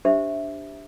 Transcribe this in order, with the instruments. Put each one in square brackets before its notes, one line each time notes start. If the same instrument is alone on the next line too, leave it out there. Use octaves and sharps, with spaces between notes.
[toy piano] D4 G4 C5 E5